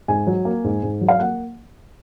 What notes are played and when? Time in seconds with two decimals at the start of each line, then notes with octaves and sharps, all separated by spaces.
0.08 G#2 G#5
0.27 F#3
0.45 A#3
0.64 G#2
0.83 G#2
1.01 F#3
1.08 F5
1.20 A#3 F#5